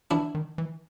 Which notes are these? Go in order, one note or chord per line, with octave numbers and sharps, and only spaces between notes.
E3 D4 E4
D#3
E3